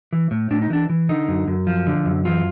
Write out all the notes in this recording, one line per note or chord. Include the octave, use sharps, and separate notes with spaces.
E3
A2
A2 D4
D#4
E3 D4
E3
D3 D#4
F#2
F#2
F3
D3
F#2
E3 F4